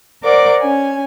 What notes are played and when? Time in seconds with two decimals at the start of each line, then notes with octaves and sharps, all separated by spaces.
0.24 A#4 C5 D5 F#5 D6
0.61 C#4 G#5